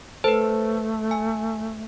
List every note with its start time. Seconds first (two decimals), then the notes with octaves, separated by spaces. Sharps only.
0.24 A3 A4 B4 C5
1.11 G#5